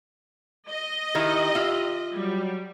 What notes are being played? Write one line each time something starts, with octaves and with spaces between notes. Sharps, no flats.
D#5
D#3 D#4 E4 G4
F4 E5
F#3 G3